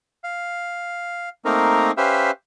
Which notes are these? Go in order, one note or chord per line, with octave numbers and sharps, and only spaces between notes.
F5
A3 A#3 C4 D#4 A#4
C#4 G4 B4 C5 E5 F5